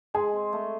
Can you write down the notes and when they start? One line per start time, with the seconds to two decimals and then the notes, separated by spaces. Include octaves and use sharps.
0.14 G#3 G#4
0.33 C4
0.53 A3